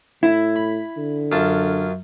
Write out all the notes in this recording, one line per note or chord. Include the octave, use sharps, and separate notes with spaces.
A2 E4
B5
D3
F#2 F4 A5